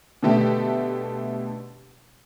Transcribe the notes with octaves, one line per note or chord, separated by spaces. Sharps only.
B2 D3 A3 G4